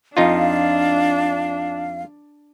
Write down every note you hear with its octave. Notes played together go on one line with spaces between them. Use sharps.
F2 D4 D#4 F4 F5